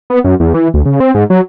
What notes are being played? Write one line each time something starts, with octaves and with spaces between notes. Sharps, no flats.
B3
F#2
E2
E3
D2
C#3
C4
G#2
F#3